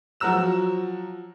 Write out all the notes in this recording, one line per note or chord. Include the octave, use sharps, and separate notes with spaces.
F3 F#3 F#4 A#5 E6 E7